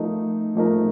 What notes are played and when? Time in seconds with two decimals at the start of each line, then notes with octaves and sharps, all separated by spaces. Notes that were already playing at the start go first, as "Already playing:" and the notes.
Already playing: F3 A3 D#4 A#4
0.55 F3 A3 D#4 A#4